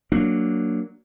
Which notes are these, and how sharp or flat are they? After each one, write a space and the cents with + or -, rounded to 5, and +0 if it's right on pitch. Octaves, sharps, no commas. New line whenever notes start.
F#3 +0 A#3 +0 D4 +0